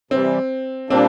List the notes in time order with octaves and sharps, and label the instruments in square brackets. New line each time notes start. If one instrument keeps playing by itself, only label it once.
[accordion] C3 E3 G3 [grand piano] C4
[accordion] A#2 G3 A#3 D4 [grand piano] C4